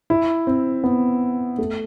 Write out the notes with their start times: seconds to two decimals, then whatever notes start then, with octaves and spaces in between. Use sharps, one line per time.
0.10 E4
0.47 C4
0.84 B3
1.58 A3